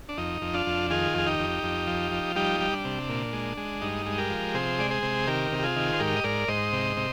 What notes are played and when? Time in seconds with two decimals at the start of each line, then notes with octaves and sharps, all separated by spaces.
0.09 D4
0.18 F2 D#4
0.42 F2
0.54 D4 F4
0.66 F2
0.90 D#3 F4 G#4
1.14 F2 G#4
1.27 D#4 G4
1.39 F2
1.63 F2
1.87 F3
2.11 F3
2.36 G3 D#4 G4
2.60 G3
2.73 D4
2.85 C3
3.09 A#2
3.33 G#3
3.57 G#3
3.81 G2 D#4
4.06 G#3
4.18 G4 A#4
4.30 F3
4.54 C3 G#4 C5
4.79 G#3 D5
4.91 G#4 C5
5.03 C3
5.27 D#3 G4 A#4
5.52 C3
5.59 G4
5.63 F4 G#4
5.76 D#3
5.93 C5
6.00 G#2 G4 A#4
6.16 D#5
6.24 G#2 A#4 D5
6.48 G#2 C5 D#5
6.73 C3
6.97 C3